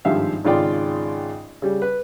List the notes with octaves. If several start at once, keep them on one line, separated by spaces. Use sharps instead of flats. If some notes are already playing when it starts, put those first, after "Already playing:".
G#1 G2 F3 G4 E5 F5
G#1 C#3 F4 D5 G5
C#3 G3
B4